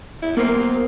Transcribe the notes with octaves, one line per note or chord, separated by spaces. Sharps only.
E4
A#3 B3 A#4 C5